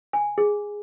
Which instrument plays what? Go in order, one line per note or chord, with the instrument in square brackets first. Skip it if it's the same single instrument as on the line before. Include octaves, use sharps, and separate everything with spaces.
[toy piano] G#5
G#4